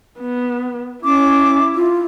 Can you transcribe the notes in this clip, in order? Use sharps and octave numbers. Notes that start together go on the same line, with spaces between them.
B3
C#4 E4 D6
F4